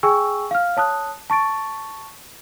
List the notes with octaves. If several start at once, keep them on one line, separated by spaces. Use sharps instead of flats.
G#4 G5 G#5 C#6 E6
F5 F6
C#5 A5 D#6 F#6
A5 C#6 A6 D7